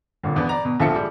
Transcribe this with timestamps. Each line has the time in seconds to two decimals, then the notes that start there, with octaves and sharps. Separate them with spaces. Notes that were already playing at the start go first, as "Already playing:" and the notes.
0.23 G1 A#2 D3
0.36 E2 B3 D4
0.49 D5 A#5
0.65 B2
0.80 A#1 D3 F3 F4 E5 C#7
0.96 G3 G#3